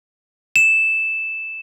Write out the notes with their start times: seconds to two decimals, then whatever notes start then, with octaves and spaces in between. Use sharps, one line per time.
0.56 E7